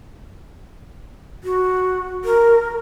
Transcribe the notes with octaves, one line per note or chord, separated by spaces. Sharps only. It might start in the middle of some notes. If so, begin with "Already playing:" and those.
F#4
A#4